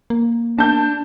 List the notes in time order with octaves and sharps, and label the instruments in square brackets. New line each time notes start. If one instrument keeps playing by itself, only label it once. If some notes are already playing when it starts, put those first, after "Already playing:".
[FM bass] A#3
[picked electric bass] D4 [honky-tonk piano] A5 G6